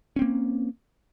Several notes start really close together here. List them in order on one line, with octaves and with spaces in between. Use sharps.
C#4 C4 A#3